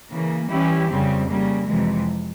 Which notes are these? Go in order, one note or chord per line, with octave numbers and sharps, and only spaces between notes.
C#3 E3 A#3
E3 G3 C#4 E4 G4
F2 C#3 G3 C4
C#3 G3 A#3
F2 C3 E3 G#3